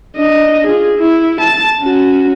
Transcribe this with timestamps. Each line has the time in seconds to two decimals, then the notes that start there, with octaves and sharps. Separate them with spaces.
0.16 D4 D#5
0.67 F4 G#4
0.99 E4
1.41 A5 A6
1.81 C#4 F#4